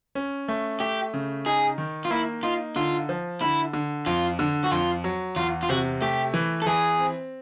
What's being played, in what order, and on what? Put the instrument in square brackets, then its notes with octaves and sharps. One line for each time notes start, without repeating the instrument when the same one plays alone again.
[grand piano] C#4
A3
[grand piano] A3 [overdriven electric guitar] G4
[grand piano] C#3
[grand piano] D#4 [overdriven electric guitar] G#4
[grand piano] D#3
[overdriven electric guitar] F4
[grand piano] A#3 [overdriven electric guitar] E4
[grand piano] D#4 [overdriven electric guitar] F4
[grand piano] D3 [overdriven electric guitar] F4
[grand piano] F3
[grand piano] D3 [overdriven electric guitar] E4
[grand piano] D3
[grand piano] F2 [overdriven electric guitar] F4
[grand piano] D3
[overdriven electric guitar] F#4
[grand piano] F2 [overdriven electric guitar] F4
[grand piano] F#3
[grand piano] E2 [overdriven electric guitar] F4
[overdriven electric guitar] F4
[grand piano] C3 [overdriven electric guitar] F#4
[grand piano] A3 [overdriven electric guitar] G4
[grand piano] E3
[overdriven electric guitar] A4
[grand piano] E3 [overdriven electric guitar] G#4
[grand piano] C4